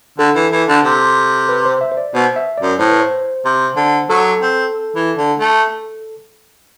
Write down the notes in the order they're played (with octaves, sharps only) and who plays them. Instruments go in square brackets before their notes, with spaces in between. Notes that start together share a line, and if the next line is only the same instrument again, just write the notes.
[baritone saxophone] D3 [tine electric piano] A4
[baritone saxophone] E3
E3
D3
C3
[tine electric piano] B4
C5
E5
C5
D5
[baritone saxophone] B2 [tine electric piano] C5
[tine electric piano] E5
[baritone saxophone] F#2 [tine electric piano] D5
[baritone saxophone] A2 [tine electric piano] C5
[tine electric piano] B4
C5
[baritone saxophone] C3
D3
[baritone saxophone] F#3 [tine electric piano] A4
[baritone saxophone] C4
E3
D3
A3